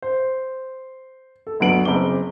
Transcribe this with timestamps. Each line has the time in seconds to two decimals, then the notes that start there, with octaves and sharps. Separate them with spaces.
0.02 C5
1.47 A4
1.60 G1 D2 F#3 B3 D7 F#7
1.85 F#1 C4 D6 G7